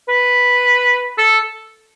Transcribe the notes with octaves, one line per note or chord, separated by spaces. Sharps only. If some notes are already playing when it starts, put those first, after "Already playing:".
B4
A4